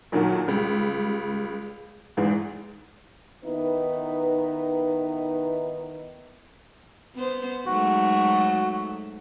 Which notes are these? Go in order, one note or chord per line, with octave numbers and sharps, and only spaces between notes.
B1 A#2 D#3 F#3
C#2 G3
G#1 G#2 E3
D#3 B3 D#4 E4 B4
B3 C5
G#2 F#3 A3 F#4